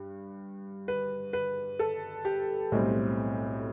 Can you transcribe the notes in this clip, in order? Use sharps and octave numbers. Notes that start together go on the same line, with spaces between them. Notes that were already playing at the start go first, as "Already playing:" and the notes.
Already playing: G2
B4
B4
A4
G4
B1 A2 G3 C4